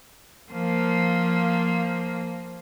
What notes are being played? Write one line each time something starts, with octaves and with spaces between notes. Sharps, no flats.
F3 A#3